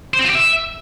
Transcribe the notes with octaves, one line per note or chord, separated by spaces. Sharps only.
C5
C4
F4
G4
E5